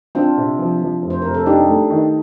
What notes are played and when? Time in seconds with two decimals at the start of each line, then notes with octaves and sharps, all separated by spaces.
0.15 C4 D4 F4
0.37 C3
0.59 F3
0.81 F3
1.02 F1
1.10 C5
1.22 F1 A#4
1.34 A4
1.46 D4 D#4 G4
1.68 A3
1.90 D#3